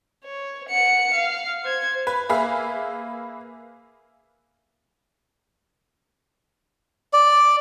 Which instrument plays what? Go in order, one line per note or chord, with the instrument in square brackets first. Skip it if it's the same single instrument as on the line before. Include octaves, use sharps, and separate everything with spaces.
[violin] C#5
F#5 C#7
F5
C5 G#6
[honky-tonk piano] B4
A#3 G#4 B4 E5 F5
[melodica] D5